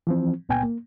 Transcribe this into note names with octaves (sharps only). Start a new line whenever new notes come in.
E3 F3 C4
C#2 A#2 B3 G5 G#5
A#3